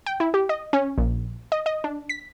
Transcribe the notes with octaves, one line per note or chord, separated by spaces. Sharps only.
G5
E4
G4
D#5
C#4
A#1
D#5
D#5
D4
B6